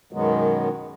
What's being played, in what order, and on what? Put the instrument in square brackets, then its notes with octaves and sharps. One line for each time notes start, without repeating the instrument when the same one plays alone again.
[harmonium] F#2 B2 D#3 F#3 G#3 B3